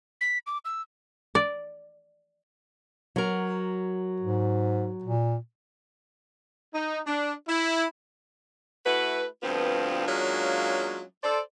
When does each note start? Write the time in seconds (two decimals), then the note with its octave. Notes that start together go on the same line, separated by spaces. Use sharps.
0.21 B6
0.47 D6
0.65 E6
1.35 D5
3.16 F#3 A#4
4.20 G#2
5.04 A#2
6.74 D#4
7.07 D4
7.48 E4
8.85 A3 E4 F#4 B4
9.42 D2 G2 F3 B3 C4 F4
10.07 F#3 G#3 A#3 C#4 D4 F4
11.23 A4 C5 D5